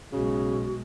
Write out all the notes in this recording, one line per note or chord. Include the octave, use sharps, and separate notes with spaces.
B1 C#3 G#3 F#4